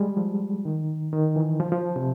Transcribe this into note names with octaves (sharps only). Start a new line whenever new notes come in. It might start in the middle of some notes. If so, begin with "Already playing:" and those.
Already playing: G3 G#3
F3
D#3
D#3
E3
F3
F3
C3